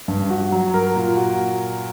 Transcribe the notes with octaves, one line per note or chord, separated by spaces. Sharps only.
G2
F#4
F#3
A#4
A#2
F#4